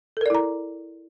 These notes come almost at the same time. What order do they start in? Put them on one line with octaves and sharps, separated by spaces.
A4 A#4 D5 E4 A#5